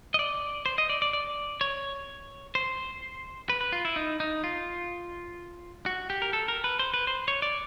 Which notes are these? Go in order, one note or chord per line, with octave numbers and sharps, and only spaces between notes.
D#5
D5
C5
D#5
D5
D5
D5
C#5
C5
B4
B4
F4
E4
D#4
D#4
F4
F#4
G4
A#4
A4
A#4
B4
C5
B4
C5
C#5
D5